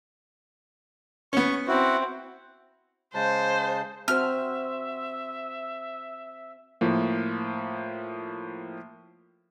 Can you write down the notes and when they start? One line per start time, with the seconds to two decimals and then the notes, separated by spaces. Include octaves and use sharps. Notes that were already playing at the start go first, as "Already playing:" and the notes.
1.33 B3 C#4 C#6
1.68 C4 E4 F#4
3.15 C#3 G#3 C5 A5
4.08 C4 F#4 C5 E5 F6
6.81 A2 F3 A#3